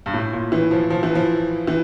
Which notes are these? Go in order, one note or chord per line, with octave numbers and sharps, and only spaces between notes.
G2
A2
A#2
E3
F3
F3
E3
F3
E3